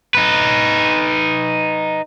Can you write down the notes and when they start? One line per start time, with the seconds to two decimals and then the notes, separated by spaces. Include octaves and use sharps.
0.15 D#4 B4